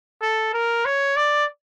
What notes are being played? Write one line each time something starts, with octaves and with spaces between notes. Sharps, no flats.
A4
A#4
C#5
D5